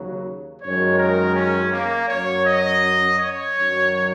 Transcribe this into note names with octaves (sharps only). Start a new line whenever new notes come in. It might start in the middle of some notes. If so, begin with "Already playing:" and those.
Already playing: D#2 C#3 F#3
F#2 D#3 G#3 C#5
A#4
C#4
A#3
F#2 F#3 C#5
D#5
C#5
F#2 D#3 F#3